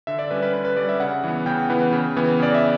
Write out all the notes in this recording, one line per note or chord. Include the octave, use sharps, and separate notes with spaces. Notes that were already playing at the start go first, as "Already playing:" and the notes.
D3 E5
D5
G3 C#4 B4
B4
D3 B4
B4
G3 C#4 D5
E5
C#3 F#5
E3 B3
C#3 G5
E3 B3
C#3
E3 B3
C#3 D5
E5